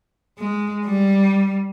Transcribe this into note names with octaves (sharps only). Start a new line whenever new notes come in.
G#3
G3